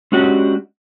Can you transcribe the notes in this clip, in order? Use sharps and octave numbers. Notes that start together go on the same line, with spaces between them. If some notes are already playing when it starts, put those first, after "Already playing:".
G#3 C#4 D4 F#4 G4 F#5